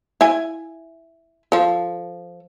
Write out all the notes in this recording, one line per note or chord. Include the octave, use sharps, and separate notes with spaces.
E4 G#5
F3 A4